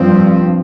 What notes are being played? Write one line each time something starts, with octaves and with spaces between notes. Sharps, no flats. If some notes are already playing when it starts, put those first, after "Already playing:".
Already playing: G2 F3 C4